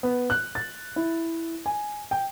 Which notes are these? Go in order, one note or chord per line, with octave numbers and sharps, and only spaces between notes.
B3
F#6
A6
E4
G#5
G5